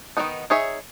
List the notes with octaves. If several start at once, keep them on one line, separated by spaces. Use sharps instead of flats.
D#3 F#3 B3 D#4
D#4 G#4 C#5 E5